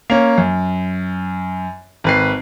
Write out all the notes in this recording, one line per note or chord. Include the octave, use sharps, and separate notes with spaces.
A#3 C#4
F#2
G#1 B4 C7